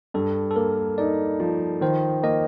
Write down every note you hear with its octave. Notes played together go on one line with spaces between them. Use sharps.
G2 A4
A4
A#3 A#4
D#4 D5
F3
D#3 C5
A#3 D#5